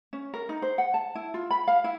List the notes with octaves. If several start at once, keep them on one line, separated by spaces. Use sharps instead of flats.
C#4
A#4
D#4
C5
F#5
A5
E4
F4
B5
F5
E4